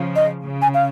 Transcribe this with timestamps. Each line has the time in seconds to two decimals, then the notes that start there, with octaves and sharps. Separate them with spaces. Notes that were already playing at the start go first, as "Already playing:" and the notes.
Already playing: C#3 F3
0.16 D#5
0.43 C#3
0.62 G#5
0.74 F5